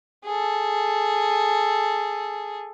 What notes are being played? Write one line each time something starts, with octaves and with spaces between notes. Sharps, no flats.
G#4 A4